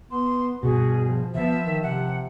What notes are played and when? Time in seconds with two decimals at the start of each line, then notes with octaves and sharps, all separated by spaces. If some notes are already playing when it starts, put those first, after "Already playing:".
0.11 B3 C6
0.63 G2 B2 F#4 G#4
1.04 F3
1.35 F3 B3 E5
1.64 D#3
1.83 C3 F#5